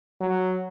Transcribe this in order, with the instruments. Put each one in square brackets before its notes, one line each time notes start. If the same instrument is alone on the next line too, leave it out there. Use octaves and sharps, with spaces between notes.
[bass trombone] F#3